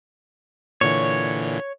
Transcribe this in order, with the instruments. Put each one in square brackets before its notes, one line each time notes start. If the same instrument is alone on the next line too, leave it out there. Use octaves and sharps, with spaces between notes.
[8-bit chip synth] A#2 D3 E3 [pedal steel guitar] C#5